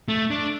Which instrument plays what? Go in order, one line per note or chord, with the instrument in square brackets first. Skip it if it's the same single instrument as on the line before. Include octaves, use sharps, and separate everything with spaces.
[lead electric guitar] A3
D4